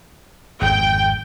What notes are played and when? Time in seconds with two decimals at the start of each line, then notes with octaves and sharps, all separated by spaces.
0.61 G#1 F2 G5